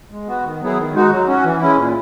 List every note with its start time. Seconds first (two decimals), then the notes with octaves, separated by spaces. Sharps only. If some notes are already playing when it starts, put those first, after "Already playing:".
0.12 G#3
0.28 B3 F#4
0.45 D#3
0.61 F#3 B3 E4 G#4
0.78 D#3
0.95 G#3 D#4 F#4
1.11 F#3
1.28 C#4 F#4
1.44 E3
1.60 G#3 C#4 E4
1.77 A#2